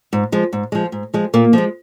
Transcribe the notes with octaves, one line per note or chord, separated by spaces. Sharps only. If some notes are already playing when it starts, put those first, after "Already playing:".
G#2
F3 G#3
G#2
F3 G#3
G#2
F3 G#3
A#2 A#3
F3 G#3